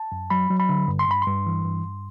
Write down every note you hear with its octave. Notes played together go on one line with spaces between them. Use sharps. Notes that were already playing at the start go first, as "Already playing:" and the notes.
Already playing: A5
F#2
F#3 B5
F#3
B5
D3
G2
C6
G2 B5
G2 C6
E3
G2
G2